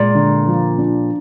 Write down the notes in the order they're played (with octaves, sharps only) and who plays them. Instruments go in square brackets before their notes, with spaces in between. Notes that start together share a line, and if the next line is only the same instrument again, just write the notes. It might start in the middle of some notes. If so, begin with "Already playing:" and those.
Already playing: [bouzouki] A#2 [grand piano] G#3
[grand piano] D3
F3
D4